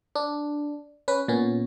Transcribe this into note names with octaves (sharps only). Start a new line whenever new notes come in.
D4
C#4 B4
A#2 B3 C#4